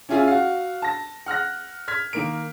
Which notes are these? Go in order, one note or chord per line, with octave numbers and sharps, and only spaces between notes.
C#4 E4 F4 G#4 E5 G#5
F#4 F5
A5 A#6
F#5 F6 F#6 A#6
F6 G#6 B6
D#3 A#3 D7